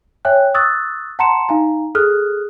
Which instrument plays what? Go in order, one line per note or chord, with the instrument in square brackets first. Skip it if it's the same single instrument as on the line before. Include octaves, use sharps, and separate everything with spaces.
[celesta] C#5 E5 G5 G#5 F#6
C#6 D#6 E6 F#6 A6
F#5 A5 A#5 C6 C#7 E7
D#4 F5 G#5 A#5
G#4 A4 D#6 F6 F#6